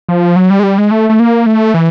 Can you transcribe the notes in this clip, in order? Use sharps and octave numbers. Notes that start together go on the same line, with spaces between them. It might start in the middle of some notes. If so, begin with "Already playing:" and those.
F3
F#3
G3
G#3
G3
G#3
A3
A3
A#3
A3
E3